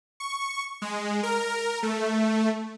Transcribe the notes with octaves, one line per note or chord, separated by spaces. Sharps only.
C#6
G#3
A#4
A3